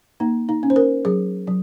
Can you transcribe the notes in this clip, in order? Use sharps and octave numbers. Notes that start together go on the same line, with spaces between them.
A#3 D#4
D#4
C#4
C5
A#4
F#3 G#4
F#3